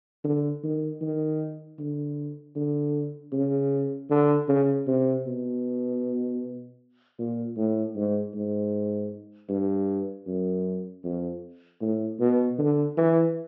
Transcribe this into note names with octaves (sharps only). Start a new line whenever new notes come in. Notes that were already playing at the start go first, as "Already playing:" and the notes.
D3
D#3
D#3
D3
D3
C#3
D3
C#3
C3
B2
A#2
A2
G#2
G#2
G2
F#2
F2
A2
B2
D3
E3